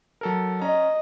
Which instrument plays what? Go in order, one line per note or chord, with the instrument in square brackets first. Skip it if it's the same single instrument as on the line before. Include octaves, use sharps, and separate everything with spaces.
[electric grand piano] F#3 A4 A#4
[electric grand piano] C#4 A#5 [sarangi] D#5